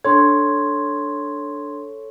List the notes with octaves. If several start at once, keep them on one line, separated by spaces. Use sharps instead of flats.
D4 A4 C#5 C6 G#6